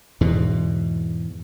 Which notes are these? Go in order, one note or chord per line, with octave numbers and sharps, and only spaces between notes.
E2 G#2 B2